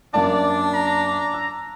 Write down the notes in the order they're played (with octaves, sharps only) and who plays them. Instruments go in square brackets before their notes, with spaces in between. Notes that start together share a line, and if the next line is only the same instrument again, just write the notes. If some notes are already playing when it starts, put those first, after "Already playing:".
[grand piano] F#2 A#3 A5 [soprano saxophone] D4 [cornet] D5
[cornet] A#5
[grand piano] E6